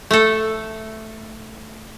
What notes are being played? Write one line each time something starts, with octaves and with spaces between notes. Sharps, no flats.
A3 A4